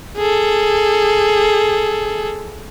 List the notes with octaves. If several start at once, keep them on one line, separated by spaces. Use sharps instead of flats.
G#4 A4